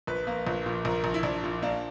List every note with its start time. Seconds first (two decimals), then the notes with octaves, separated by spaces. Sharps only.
0.07 A#1 B4
0.27 A#3
0.47 A#1
0.66 A#2
0.85 A#1 A#4
1.04 A#1
1.14 E4
1.23 A#1 D4
1.44 A#2
1.63 A#3 D4